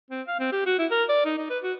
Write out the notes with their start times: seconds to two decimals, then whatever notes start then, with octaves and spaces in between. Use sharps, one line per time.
0.11 C4
0.28 F5
0.40 C4
0.52 G4
0.66 F#4
0.79 E4
0.91 A#4
1.09 D5
1.26 D#4
1.38 D#4
1.50 B4
1.63 F#4